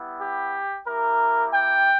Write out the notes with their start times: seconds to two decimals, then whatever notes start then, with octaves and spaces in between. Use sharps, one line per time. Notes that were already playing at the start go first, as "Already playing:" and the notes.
Already playing: G3 B3 E4
0.21 G4
0.87 A#3 E4 G4 A#4
1.53 G5